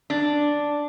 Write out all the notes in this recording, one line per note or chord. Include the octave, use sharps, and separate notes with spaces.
D4